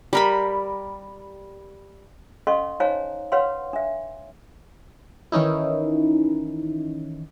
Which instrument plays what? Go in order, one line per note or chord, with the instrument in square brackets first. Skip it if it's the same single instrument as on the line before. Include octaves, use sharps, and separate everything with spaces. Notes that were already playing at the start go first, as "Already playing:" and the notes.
[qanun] G3 A#4 B5
[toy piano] C#4 A4 D#5 F5 C6 C#6
D#4 C5 C#5 F5 G#5 A#5
B4 C#5 F5 F#5 C6
D4 E5
[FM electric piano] D#3 E3 C#4 D#4 E4